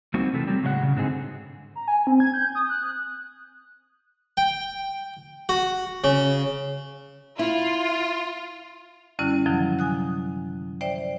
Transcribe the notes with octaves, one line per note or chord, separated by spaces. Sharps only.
G3 A#3 C4 D#4 F#4
C3 E3 A3
F#3 G3 C4
A2 C#3 F#3 G#3 D#5 F#5
C#3
G#2 D3 C4 D#4 G#4
A#5
G#5
C4
G#6
G6
D#6
F#6
G5
F#4
C#3
E4 F4
F#2 D3 G3 C#4 E4 F#6
F#2 C3 D#3 F3 F#3
G#5 D#6 F#6
C5 D5 E5 G5